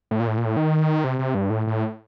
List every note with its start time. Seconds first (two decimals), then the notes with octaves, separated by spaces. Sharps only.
0.11 A2
0.20 A#2
0.27 A2
0.37 A#2
0.45 A2
0.57 D#3
1.04 C3
1.19 C3
1.35 G2
1.50 A2
1.67 A2